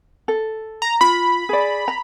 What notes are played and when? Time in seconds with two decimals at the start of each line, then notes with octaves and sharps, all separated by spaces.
0.28 A4
0.82 A#5
1.01 F4 B5
1.49 G#4 D5
1.88 A#5